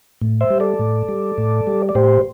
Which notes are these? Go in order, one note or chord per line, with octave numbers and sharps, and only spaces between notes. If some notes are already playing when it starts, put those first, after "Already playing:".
A2
C5 E5
G3
A4 D5
A2
G3
A2
G3
D5
A2 G4 C5